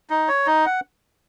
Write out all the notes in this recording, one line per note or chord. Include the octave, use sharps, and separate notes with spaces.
D#4
C#5
D#4
F#5